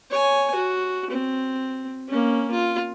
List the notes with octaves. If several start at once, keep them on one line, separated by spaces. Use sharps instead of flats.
C#5 G#5
F#4
C4
A#3 C#4
F4